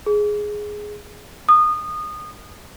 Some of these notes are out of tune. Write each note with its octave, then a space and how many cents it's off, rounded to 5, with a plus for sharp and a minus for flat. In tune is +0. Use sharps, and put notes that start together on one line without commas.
G#4 +5
D#6 -25